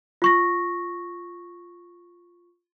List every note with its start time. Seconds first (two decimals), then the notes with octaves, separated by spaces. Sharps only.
0.22 F4 C#6 A#6